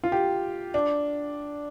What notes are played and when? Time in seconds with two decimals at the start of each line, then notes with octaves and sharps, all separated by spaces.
0.04 F4
0.12 G4
0.74 D4